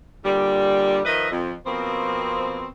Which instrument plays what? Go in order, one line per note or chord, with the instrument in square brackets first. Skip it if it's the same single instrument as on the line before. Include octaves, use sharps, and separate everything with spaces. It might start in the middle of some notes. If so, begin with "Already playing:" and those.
[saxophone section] A#2 D3 G3
D#3 F3 B4 D#5 E5
F2
B2 F3 A#3 C4